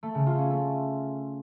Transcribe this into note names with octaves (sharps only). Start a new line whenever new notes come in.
A3
C#3
F4
C#4
A3